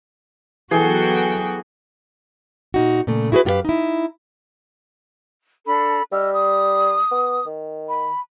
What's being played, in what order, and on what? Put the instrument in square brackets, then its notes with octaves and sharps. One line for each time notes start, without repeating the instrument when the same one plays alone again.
[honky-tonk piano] E3 [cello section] F#3 B3 F#4 [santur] G#4 [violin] A4 G5
[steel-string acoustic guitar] A#2 D#4 F#4
A#2 C#3 A3
E4 F#4 G#4 A#4 B4
F#2 F4 G4 A#4 B4 F5
D#4 E4
[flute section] D4 A4 B5
[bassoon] G3 [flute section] D#5 E6 F6
[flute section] D#6
[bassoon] B3
D#3
[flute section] B5